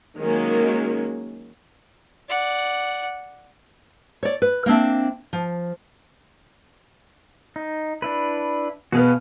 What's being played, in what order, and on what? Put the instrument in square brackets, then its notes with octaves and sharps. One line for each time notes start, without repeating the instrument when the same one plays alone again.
[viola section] D#3 F#3 G#3 A#3 C#4
[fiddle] D5 F#5
[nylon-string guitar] C#5 D5
B4
A#3 C4 D4 E5
F3
[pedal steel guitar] D#4
D4 E4 B4
[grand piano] B2 B3 [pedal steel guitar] F#4 G#4 F5